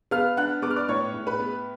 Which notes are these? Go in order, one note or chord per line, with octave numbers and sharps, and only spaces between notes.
B3 F5 F6
D4 F#5 F#6
B3 D6
F6
D5 D6
A2 C#5 C#6
A2
B4 B5
B3